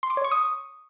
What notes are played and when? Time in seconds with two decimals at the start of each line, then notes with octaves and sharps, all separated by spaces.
0.03 C6
0.10 D6
0.17 C#5
0.24 C#6
0.31 D#6